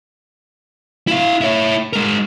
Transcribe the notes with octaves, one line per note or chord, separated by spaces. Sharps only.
E4 F5
E4 C#5
G#3 A#4